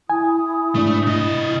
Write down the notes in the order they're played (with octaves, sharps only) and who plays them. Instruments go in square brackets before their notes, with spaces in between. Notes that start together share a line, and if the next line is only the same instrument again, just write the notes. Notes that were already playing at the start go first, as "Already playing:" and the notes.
[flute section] E4 D#6 [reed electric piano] G#5
[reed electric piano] G#2 D4 [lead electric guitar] A3
[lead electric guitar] C3 D#5